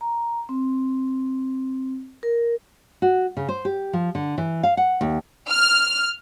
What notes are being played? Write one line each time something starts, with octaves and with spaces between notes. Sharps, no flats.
A#5
C4
A#4
F#4
C#3
C5
G4
F3
D3
E3
F5
F#5
D#2
F6